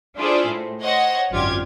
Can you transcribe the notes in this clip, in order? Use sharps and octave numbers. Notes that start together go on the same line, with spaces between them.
D4 E4 F4 G#4 A4 C5
A2
C5 C#5 D#5 F#5
G#1 F#2 D3 F4 G4 G#6